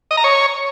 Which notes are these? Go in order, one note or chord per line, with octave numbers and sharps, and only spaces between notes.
D#5
A#5
C#5